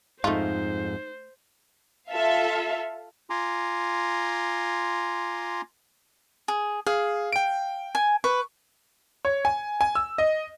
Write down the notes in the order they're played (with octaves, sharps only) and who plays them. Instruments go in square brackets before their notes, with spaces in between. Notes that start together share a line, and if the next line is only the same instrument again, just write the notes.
[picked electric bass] F2 G#2 [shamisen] A3 F4 [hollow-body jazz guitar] D#4 F5 [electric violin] C5
[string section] F4 A4 E5 F5
[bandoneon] F4 G#5 A#5 C6 D6
[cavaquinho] G#4
[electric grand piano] G#4 [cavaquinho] F5
[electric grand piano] G5 D7
[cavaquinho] G#5
[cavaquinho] B4 [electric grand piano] C#6
[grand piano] C#5
G#5
G#5
E6
D#5